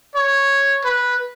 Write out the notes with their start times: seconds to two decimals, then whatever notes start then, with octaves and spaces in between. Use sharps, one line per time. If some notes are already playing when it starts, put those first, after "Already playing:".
0.15 C#5
0.84 B4